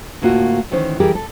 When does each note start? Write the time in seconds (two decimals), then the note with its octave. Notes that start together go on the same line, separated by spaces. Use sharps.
0.22 D2 A2 A#3 F4 F#4
0.71 D2 D#3 E3 C#4 C5
1.00 E3 G3 G4 G#4 A#4
1.15 A4